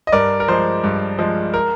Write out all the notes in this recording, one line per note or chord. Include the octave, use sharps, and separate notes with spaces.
D#5
G2 A#4 D5
A#4
F3 G#3 C5
G2
F3 G#3
A#4